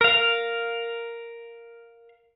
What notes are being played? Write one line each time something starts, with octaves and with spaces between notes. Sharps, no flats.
A#4 F5